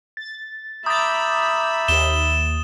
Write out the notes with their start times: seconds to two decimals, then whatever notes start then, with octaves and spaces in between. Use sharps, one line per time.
0.17 A6
0.86 E5 A#5 B5 D6 D#6 G6 A6
1.88 D#2 E7 G7